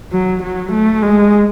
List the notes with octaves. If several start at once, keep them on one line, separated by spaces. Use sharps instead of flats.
F#3
F#3
A3
G#3